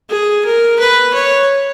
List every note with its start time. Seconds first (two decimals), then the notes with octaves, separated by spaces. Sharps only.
0.10 G#4
0.45 A#4
0.80 B4
1.14 C#5